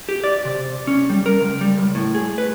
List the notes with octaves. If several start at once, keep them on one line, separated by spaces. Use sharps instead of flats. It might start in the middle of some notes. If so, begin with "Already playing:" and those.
G4
D5
C3
C#4
G3
A#4
C#2
G3
C#2
A2
G#4
B4